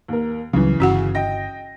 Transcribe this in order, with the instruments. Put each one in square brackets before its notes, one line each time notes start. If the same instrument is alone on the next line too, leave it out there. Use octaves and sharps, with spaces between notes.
[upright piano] D#2 A#4
[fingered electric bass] C#2 F#3 G3 [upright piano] C#3 E3
[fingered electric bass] G1 [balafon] C#4 F#4 F#5
[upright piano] D#5 G5 A#6